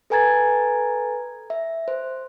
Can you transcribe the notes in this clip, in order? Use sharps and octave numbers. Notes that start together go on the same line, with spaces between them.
A4 B4 G#5 A#5 G#6 A6
E5
C5